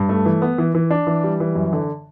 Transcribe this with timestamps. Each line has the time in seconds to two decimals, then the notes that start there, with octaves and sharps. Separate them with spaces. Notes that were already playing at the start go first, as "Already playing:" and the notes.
Already playing: G2
0.09 A3
0.25 E3
0.42 B3
0.58 E3
0.75 E3
0.90 D4
1.07 E3
1.24 G3
1.40 E3
1.55 F#2
1.73 D3